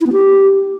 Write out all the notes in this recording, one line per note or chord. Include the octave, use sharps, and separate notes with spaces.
E4
B3
G4